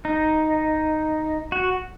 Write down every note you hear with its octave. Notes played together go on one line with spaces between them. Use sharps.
D#4
F#4